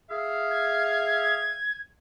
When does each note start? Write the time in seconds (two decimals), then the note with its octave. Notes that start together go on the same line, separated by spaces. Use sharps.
0.10 G#4 E5 F5
0.51 G#6